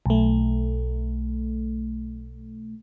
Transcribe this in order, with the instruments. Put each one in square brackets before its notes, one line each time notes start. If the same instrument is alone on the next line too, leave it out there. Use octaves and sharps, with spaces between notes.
[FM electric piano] B1 A3